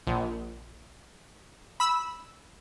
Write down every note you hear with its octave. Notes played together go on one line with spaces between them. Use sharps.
A#1
B5 E6